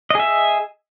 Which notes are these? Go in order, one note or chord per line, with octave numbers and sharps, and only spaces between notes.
G#4 D#5 E5